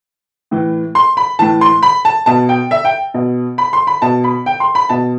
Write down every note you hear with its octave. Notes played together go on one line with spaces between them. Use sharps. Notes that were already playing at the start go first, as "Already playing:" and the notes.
A2 E3
C6
B5
A2 E3 A5
C6
B5
A5
B2 A5
G5
E5
G5
B2
B5
C6
B5
B2 A5
B5
G5
C6
B5
B2 A5